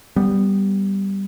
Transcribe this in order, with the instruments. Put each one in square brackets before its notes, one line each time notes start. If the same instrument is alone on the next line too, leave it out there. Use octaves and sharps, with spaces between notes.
[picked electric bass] G3 B3